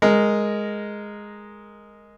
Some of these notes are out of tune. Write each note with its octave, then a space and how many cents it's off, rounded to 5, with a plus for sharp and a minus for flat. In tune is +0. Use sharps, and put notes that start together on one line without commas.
G#3 +0 A#4 +0